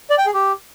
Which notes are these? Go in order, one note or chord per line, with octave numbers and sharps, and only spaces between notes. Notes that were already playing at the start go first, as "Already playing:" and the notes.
D5
G5
G#4
G4